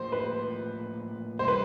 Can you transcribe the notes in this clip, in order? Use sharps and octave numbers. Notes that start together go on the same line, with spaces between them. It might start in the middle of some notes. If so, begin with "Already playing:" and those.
Already playing: A2 F3 A#3 C5
B4
C3 E3 G3 C5
B4